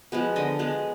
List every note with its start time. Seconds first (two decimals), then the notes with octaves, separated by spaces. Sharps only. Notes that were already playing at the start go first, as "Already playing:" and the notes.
0.12 F3 G#3 B3
0.36 D3 D#5
0.59 F3 G#3 B3